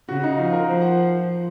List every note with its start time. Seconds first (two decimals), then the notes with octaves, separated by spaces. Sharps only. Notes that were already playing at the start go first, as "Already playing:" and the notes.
0.09 C#3 F#4
0.24 D#4
0.38 F3 F4
0.53 A#4
0.67 F3 C5
0.82 F#5